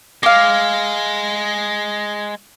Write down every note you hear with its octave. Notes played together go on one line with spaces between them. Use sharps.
G#3 F5 D6